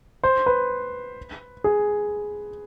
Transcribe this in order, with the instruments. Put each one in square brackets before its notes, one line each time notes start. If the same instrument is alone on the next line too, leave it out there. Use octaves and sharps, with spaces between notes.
[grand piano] C5
B4
G#4